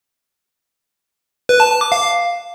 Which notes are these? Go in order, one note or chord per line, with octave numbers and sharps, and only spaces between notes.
B4
A5
A5
D6
F5